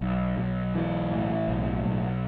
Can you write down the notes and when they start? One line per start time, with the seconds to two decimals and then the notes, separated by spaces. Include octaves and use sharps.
0.01 B1
0.38 B1
0.75 E3
1.11 A2
1.48 B1
1.84 B1